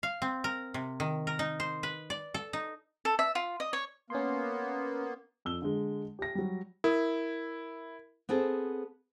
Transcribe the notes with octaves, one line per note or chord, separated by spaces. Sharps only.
F5
C4
A#4
C3
D#3
A#4
D#4
C5
B4
D5
A4
D#4
A4
E5
F4
D#5
C#5
A#3 B3 C#4 C6
F2 E6 G7
D3 G#3
G4 A#6
F#3 G3
E4 A#4
B3 C4 G#4 A4